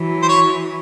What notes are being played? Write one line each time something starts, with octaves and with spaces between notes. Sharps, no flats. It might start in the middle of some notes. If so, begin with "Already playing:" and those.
Already playing: E3 F#3
C5
C#5